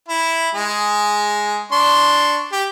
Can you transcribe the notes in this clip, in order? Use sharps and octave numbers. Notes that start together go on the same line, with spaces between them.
E4
G#3 G#4
D4 C6 C#6
G4